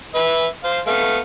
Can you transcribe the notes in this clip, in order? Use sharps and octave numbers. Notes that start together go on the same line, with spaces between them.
B4 E5
C5 F5
A3 B3 F5